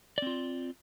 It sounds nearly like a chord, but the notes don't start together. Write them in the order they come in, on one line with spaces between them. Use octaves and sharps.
D5 C4 F4